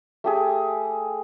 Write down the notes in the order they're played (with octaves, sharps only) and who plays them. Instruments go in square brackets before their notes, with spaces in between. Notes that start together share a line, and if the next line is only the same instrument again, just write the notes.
[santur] A3 G4 G#4